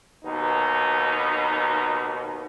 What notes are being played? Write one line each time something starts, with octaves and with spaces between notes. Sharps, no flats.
D#2 B2 D#4